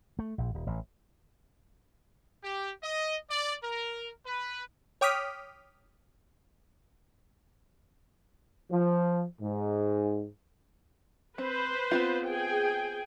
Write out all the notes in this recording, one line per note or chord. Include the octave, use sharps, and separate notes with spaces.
A3
A#1
D#1
A1
G4
D#5
D5
A#4
B4
C#5 G5 D6 D#6 F6 B6
F3
G#2
C4 B4 C5
B3 C4 F4
G#4 G5 G#5